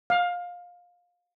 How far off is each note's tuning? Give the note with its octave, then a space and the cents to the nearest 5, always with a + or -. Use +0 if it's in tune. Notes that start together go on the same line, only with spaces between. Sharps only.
F5 +20